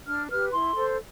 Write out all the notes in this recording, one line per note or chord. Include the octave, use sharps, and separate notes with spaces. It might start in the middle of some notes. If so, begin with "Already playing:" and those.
D4 F6
G4 B4 F6
E4 C6
A4 C5